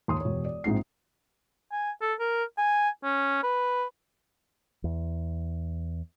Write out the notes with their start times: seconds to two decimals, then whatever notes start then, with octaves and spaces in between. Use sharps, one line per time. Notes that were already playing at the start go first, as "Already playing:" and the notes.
0.08 D#2 C6 D#6
0.21 E1 C#5
0.45 D5
0.64 A#1 G#2 C4 C7
1.72 G#5
2.01 A4
2.20 A#4
2.58 G#5
3.04 C#4
3.43 B4
4.84 E2